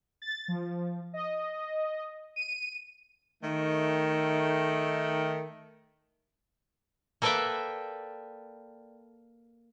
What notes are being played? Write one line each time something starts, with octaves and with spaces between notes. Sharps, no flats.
A6
F3
D#5
D#7
D#3 A3
A#3 A4 B4 D5 E5 G5